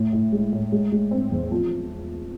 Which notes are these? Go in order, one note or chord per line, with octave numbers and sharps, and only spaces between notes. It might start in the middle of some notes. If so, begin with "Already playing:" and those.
Already playing: A2
A2
G#3
A2
G#3
G#3
C4
E2
F3